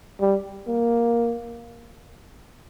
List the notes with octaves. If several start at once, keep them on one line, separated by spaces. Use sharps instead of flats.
G3
A#3